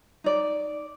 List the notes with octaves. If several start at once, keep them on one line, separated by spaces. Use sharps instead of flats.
D#4 D5